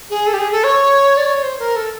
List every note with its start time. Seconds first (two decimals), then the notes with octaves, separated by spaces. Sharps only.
0.10 G#4
0.27 A4
0.33 G4
0.39 G#4
0.52 A4
0.64 C#5
1.17 D5
1.26 C#5
1.43 C5
1.59 A#4
1.76 A4